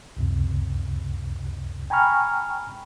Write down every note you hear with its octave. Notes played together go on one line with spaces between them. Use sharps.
C#2 F#2 C3
G5 G#5 A#5 B5 C#6 F6